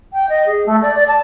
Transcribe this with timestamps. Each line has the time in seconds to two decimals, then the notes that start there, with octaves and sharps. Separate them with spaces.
0.13 G5
0.29 D#5
0.47 G#4
0.66 A3
0.82 D5
0.96 D5
1.08 A5